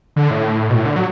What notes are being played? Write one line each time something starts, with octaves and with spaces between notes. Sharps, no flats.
D3
A2
B2
A2
D3
F#3